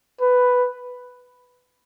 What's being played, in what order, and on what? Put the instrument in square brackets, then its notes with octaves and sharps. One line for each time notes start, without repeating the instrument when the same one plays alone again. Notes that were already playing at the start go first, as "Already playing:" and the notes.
[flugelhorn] B4